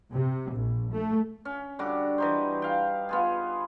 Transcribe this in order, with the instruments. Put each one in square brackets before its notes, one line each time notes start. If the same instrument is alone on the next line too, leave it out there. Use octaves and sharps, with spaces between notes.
[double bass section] C3
A#1
A3
[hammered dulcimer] C#4
D3 G3 F#4 D6
E3 D#4 C5
F5 G5
B3 F4 G#4